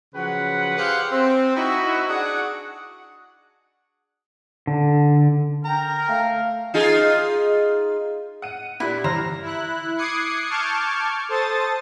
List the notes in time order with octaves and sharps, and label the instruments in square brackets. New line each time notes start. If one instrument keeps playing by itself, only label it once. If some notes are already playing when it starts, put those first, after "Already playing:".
[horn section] C#3 F3 F#3 B4 F#5
G4 G#4 B4 C5 F5 F#5
C4
D#4 E4 F#4
D4 F#4 G#4 F#5
[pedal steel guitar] D3
[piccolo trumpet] A#4 [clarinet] G5 [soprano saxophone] A#5
[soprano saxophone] A3 [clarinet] F5
[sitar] D#4 F4 G#4
[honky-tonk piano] F#5 D#7
[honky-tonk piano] A#2 F#6 [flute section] D4 G4 D5 [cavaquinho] E4
[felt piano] E3 [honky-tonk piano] C5 E6 F6 [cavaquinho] A#5
[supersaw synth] E4 F#6
D6 D#6 F#6 G#6 C7 C#7
A5 C#6 D6 F6 G6 G#6
A4 C5 A5 D#6 A6